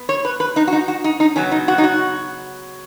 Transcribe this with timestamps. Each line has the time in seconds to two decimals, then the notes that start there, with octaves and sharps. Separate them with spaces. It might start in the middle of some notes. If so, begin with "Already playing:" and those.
Already playing: B3
0.09 C#5
0.25 B4
0.40 B4
0.56 D#4
0.67 F#4
0.73 D#4
0.88 F#4
1.04 D#4
1.20 D#4
1.36 C#3 F#3 B3 C#4
1.52 D#4
1.68 F#4
1.78 D#4
1.84 F#4